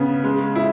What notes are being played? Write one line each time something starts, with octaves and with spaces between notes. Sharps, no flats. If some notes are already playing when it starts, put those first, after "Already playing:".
Already playing: C#3 B3
G#3
E4